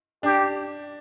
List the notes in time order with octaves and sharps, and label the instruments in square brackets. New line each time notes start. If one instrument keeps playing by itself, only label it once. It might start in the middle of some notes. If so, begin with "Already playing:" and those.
[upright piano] D4 [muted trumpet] G4